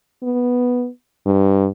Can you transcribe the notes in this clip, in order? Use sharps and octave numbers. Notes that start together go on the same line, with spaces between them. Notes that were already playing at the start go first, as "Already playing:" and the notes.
B3
G2